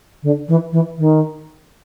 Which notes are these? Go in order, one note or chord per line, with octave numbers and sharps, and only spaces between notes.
D3
E3
E3
D#3